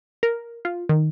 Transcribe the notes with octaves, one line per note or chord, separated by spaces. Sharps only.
A#4
F4
D#3